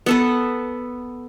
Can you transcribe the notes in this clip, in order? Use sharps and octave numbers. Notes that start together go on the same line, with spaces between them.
B3 A4 B4